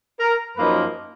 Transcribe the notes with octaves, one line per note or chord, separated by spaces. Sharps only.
A#4
F#2 F3 A#3 D#4 B4